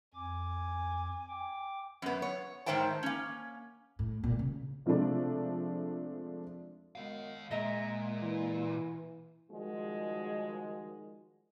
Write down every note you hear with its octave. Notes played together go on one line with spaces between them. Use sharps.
F2 G#5 D6
G5 D6
F#2 B3
C#5
G#2 D#3 C5 E5 G5 A5
A#3 C#4
A2
A#2
C#3
C3 F3 G#3 A3 D4
F#2 D#3 G#3 B3 F5
A#2 G#3 D#5 E5 A#5
E3
D#3 F3 G3 G#3 D#4 F#4